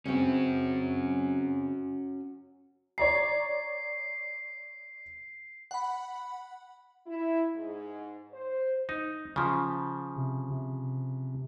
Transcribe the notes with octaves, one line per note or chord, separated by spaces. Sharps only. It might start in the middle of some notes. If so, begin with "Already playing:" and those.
C#3 C4 C#4 F#4
C#5 D5 A#5 C7
F#5 B5
E4
G#2
C5
D#4
C#3 F3
C3
C3